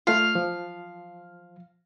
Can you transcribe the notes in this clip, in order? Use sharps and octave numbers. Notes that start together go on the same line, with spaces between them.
A3 F4 F5
F3